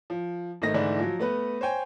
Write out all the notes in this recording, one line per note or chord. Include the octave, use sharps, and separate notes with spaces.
F3
G#1 D#3 A3 D#5 A#6
G#2 D3 E3 A3 D4 E4
F3 F#3
A3 B3 B4
C5 C#5 G5 G#5